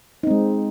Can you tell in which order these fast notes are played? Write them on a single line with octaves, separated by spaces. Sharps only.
D#4 C4 G#3